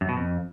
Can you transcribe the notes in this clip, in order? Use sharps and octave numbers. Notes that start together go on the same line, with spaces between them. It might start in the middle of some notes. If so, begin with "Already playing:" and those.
F#2
B2
F2